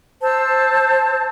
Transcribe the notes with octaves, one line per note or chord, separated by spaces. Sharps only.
C5 A5 E6